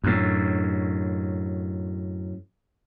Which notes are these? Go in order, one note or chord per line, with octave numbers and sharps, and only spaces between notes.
F#2 A2